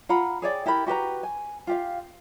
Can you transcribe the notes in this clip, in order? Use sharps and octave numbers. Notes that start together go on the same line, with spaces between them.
F4 F#5 A#5 B5
G#4 C#5 D5 G5
E4 G4 A#4 B5
F#4 G4 B4 A#5
G#5
F4 G4 F5